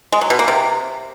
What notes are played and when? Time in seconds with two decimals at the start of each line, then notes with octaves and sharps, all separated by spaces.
0.12 G#3
0.21 F#3
0.30 B2
0.39 A#3
0.48 C3